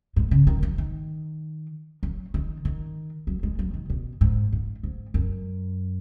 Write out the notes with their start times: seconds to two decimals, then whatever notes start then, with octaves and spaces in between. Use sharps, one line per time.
0.16 G#2
0.31 C#3
0.47 D#3
0.63 F#3
0.78 D#3
2.03 F#3
2.34 D#3
2.65 D#3
3.27 F#3
3.43 G#3
3.59 F#3
3.74 D#3
3.90 B2
4.21 G#2
4.52 G#2
4.83 G#2
5.14 F#2